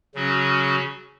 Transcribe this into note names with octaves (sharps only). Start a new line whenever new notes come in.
C#3 F#3 C#4 F#4